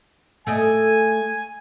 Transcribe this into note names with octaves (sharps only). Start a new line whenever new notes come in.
A3 D5 D#5 G#5